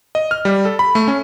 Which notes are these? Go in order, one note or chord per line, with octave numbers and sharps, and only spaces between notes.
D#5
F6
G3
A4
B5
A3
C#4